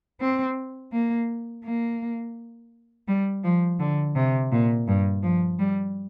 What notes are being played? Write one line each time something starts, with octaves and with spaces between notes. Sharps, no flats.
C4
A#3
A#3
G3
F3
D3
C3
A#2
G2
F3
G3